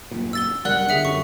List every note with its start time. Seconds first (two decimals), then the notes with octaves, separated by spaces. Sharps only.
0.11 G#1 F#2 A#2
0.33 E6 A6 G7
0.65 C2 F#2 G3 A#4 D5 F#5 F#6
0.89 G2 D3 G#4 E5 C#7
1.05 F#2 C#6